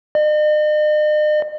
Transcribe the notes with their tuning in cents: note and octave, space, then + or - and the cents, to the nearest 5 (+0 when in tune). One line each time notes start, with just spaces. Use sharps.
D#5 -45